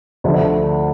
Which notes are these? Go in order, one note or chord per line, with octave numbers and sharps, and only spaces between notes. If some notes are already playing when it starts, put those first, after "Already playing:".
D2 D3 F3 A3